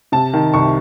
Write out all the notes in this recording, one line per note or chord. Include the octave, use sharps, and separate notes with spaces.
C3 A5
D#3
C2 C#6